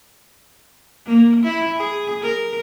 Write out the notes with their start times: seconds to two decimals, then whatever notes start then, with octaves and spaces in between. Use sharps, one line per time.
1.06 A#3
1.44 E4
1.77 G#4
2.22 A#4